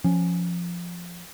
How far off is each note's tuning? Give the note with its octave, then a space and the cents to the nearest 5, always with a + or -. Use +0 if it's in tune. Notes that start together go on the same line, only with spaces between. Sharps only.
F3 +0 C#4 +0